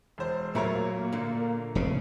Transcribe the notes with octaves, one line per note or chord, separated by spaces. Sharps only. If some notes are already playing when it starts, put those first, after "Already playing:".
E1 C5
A#2 F#3 A3 A#4 C#5
A#3
A#2 D3
F1 C#3